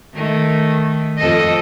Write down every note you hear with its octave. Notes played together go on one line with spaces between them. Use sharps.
D#3 A3
F2 A4 D#5